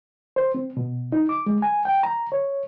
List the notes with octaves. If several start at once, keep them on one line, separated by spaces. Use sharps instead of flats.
C5
C4
B2
D#4
D6
G#3
G#5
G5
A#5
C#5